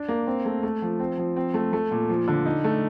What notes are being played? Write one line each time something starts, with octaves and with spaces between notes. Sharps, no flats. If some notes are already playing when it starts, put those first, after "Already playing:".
Already playing: D4
A#3
C4
A3
A3
F3
C4
F3
C4
A3
A3
A#2
F3
D3
D#4
A3